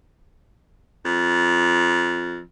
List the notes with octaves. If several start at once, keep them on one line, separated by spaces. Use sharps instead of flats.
F2